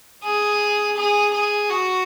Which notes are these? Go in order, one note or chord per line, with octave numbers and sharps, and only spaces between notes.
G#4
G#4
G#4
F#4